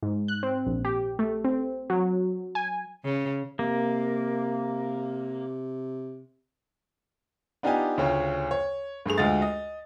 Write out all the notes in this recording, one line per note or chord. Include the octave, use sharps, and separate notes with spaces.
G#2
F#6
C4
A#1
G4
A3
C4
F#3
G#5
C#3
C3 A#3
B3 D4 D#4 F4 G4 G#5
D2 C#3 C#4 F4 G5
C#5
G2 A3 G#4 F7
D2 G#3 F4 F#4 D#5 A6
D#5